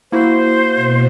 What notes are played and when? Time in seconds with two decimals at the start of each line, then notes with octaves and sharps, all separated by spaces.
0.12 A#3 E4 F#4 C5
0.76 B2